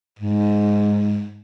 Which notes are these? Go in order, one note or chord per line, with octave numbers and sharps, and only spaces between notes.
G#2